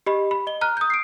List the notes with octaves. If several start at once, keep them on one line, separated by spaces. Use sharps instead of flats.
G4 D#5 B5
B5
D#5 G7
A#5 F6 F#6
D#6 G6
C7 D7